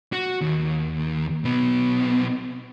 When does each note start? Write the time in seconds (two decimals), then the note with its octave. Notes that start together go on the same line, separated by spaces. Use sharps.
0.13 F#4
0.41 D#2
1.44 B1 B3